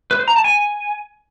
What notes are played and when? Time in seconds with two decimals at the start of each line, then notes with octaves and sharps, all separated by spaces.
0.11 B4
0.19 C5
0.28 A#5
0.36 A5
0.44 G#5